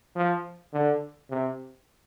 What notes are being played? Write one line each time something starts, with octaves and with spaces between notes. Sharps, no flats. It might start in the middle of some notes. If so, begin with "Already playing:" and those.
F3
D3
C3